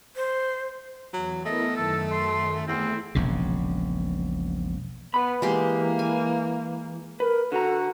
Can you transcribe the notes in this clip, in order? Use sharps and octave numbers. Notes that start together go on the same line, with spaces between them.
C5
E2 F#3
A3 B3 E4 A#4 D#5
F#2 D#3 A4
C6
E2 A3 C4 E4
E1 A#1 C#3
B3 B4 B5
E3 G#3 A#3 G4 C6
G#5
A#4 B4
D3 F#4 A4 A#5